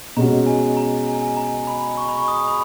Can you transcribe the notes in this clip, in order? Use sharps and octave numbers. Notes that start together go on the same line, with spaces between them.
B2 G#3 C#4 F#4 A#5
G#5
A#5
G#5
A#5
G#5
A#5
B5
C#6
B5
C#6
D#6
B5